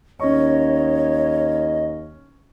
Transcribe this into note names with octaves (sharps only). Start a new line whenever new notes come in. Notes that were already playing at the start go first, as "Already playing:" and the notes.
D#2 C#4 C#5 D#5 C#6